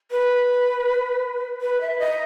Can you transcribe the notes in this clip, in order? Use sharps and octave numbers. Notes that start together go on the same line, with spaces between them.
B4
B4
E5
D#5